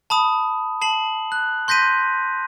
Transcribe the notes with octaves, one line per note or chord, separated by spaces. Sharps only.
A5 B5 D#6
A5 C7 F#7
F#6
C6 G6 A#6 B6 D#7